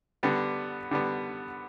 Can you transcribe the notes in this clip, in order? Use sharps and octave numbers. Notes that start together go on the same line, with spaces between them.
D3 G3 B3
D3 G3 B3